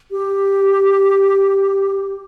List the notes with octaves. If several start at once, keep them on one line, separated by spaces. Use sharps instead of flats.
G4